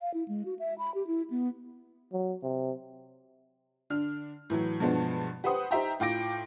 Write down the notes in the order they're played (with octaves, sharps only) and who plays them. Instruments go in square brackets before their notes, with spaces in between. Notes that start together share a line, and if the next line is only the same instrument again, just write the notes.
[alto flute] F5
E4
G#3
F#4
E5
B5
G4
E4
B3
[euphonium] F#3
C3
[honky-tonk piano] D3 D4 F6
A2 E3 F#3
G2 B2 F3 G#3 B3 D4
G4 B4 C5 F#5 D#6
D#4 G4 C5 E5 G5 A#5
A2 F4 G5 D6 A#6 D7